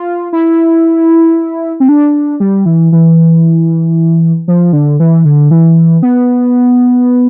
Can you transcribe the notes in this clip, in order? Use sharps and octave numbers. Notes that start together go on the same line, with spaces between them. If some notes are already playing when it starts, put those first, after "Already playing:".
Already playing: F4
E4
C4
D4
G3
E3
E3
F3
D3
E3
D3
E3
B3